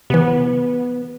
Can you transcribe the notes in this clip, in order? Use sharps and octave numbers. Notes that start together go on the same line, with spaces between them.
C3 E3 B3